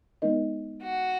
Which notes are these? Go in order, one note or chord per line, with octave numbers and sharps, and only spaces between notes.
G#3 B3 D#4 A#4 D#5
F#4